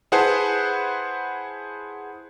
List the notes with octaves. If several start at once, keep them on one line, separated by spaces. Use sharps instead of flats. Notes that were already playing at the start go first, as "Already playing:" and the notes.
E4 G#4 B4 C5 F#5 A5